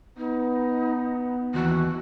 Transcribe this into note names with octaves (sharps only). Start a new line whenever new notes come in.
B3 D#4
D#2 E3 F#4